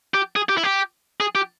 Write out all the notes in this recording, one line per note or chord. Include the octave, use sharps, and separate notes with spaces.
G4
G#4
G4
E4
G4
G#4
G4